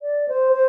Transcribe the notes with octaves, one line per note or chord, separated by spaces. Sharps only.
D5
C5
C5